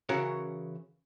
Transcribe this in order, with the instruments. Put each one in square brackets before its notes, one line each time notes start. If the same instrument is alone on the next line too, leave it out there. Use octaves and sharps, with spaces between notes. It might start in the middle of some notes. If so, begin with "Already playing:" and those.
[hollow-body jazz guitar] C#3 E3 C#4 F#4 A#4 C#5